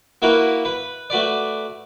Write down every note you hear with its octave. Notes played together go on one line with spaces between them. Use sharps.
A#3 E4 F#4 A#4 B4
B4
A3 F#4 B4 D5